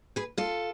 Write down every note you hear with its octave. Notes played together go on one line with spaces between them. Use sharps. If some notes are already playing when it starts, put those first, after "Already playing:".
G#4 B4
F4 A4